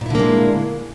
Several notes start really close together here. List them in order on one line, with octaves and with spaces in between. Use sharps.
A#2 E4 D3 A#3 G#3